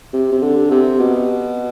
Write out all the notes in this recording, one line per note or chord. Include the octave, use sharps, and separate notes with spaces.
C3
C3
D3
C3
B2